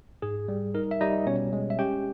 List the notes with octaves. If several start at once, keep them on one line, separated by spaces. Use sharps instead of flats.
G#2 G#4
G3
D#4 A#4
E5
G3 D#4 D#5
B2 C#4 C#5
G#3
E5
C#4 G4 G5